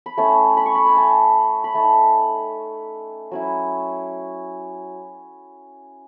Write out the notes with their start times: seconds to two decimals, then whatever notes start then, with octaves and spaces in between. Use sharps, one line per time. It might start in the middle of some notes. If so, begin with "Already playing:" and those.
0.06 B5
0.17 A3 C#4 E4 A5
0.57 B5
0.66 C#6
0.75 B5
0.86 G#5
0.97 A5
1.64 B5
1.74 A3 D#4 A5
3.31 F#3 C#4 E4